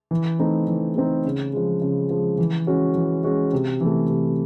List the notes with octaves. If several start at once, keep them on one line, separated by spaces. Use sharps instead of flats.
E3
A3 C4 D#4
E3
A3 C4 D#4
C#3
F3 G#3
C#3
F3 G#3
E3
G#3 C#4 F#4
E3
G#3 C#4 F#4
C3
E3 A3
C3